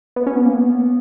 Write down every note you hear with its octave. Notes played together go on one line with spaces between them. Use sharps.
B3
C#4
B3
A#3
B3